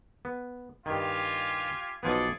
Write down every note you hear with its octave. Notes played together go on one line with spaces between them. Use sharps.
B3
G2 D#3 F4 G4 G#5
B1 F3 B3 G#4 A4 D5